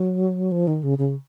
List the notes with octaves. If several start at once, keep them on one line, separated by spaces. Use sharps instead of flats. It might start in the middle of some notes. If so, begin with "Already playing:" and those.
Already playing: F#3
F3
D#3
C#3
C#3